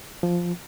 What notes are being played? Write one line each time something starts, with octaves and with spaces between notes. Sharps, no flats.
F3